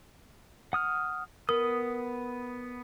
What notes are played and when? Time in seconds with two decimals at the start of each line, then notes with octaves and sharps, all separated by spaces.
0.73 F#5 D#6 F6
1.49 B3 A#4 D#6